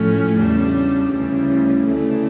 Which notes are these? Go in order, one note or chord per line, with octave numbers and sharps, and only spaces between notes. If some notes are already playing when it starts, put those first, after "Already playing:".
Already playing: A2 F3 A3 C#4
E2 C#3 G3 D4
D2 C#3 E3 G3
D2 C#3 E3 A3 D4